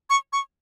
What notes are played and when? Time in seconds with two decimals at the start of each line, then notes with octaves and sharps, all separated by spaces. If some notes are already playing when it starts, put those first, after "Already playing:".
0.10 C#6
0.33 C#6